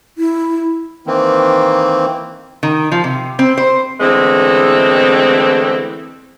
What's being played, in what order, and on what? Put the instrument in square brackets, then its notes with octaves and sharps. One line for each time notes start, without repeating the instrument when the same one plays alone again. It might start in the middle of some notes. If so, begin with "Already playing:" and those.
[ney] E4
[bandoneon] D#3 E3 A#3 C4
[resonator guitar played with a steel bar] D#3
F3
C3
C4
C5
[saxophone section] D3 E3 G#3 A3 B3 C4